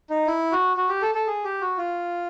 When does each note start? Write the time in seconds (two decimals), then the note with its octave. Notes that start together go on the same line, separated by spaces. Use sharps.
0.10 D#4
0.27 E4
0.52 F#4
0.77 F#4
0.89 G4
1.02 A4
1.15 A4
1.27 G#4
1.44 G4
1.61 F#4
1.78 F4